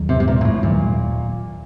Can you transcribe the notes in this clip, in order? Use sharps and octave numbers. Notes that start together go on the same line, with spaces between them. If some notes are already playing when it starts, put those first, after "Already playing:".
Already playing: D#2 D#3 F#3
C3
C3
A#2
A#2
A2
D#2 A#2 D#3 F#3